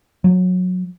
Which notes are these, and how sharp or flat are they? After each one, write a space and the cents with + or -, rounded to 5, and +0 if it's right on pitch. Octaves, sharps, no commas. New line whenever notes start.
F#3 -20